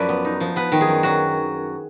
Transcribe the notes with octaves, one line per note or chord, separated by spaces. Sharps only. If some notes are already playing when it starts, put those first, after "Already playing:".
Already playing: F#2 F3 B4 D5
B3
D#4
F3
B3 B4
D#3
G#4
F#2
F#3 F#4